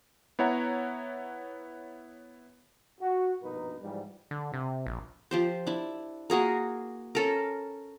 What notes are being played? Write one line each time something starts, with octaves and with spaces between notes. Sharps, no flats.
B3 E4 C#5 F#5 A#5
F#4
A#1 G2 B2 D#4 A#4 B4
G#2 E3 F3 G3
D3
C3
A#1
F3 G4 C5
D4 E4
A#3 F#4 G#4 A#4
C#4 A4 A#4